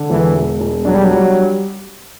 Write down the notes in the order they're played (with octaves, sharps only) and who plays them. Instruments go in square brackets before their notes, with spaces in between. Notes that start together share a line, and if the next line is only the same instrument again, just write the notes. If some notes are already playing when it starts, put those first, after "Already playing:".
Already playing: [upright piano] D3
[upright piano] E1 [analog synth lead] E3
[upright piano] E1
E1
[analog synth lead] F#3 [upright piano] D4
[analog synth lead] G3
F#3
[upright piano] G3